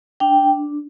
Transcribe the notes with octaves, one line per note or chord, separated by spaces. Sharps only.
D4 G5